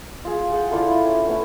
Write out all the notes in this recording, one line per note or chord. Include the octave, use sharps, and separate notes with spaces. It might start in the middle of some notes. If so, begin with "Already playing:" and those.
F4 G#4
G#4 F#5 G5
D4 E4 F4 A4
E4
C#4
A3 B3 E4